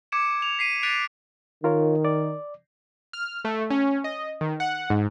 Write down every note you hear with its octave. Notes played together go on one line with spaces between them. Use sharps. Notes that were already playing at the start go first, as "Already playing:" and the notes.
D6 G#6 C#7 D7 E7
F7
B6 C7 D#7
F#6 A6 B6 D7 D#7 F7
D#3 F4 A#4 C#5
D5
F6
A3
C#4
D#5
D#3
F#5
G#2